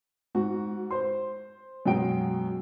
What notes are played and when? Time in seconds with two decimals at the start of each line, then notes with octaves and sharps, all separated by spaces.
0.35 G#2 F#4
0.91 C5 C6
1.86 F#2 B2 G#3 G5 D7